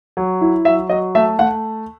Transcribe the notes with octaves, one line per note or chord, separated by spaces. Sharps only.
F#3
E4
F#3 E5
F#3 D#5
A3 E5
A3 F#5